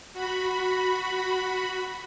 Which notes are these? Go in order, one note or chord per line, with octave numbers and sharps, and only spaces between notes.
F#4 B5